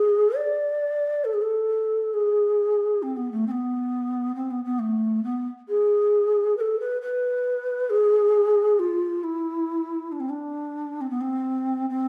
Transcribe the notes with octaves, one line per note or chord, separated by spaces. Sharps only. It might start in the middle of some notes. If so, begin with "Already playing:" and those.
Already playing: G#4
D5
A4
G#4
A4
G#4
C4
B3
A3
C4
B3
C4
B3
B3
A3
B3
G#4
B4
A4
B4
B4
G#4
F4
E4
D4
C4
D4
C4
B3
C4
C4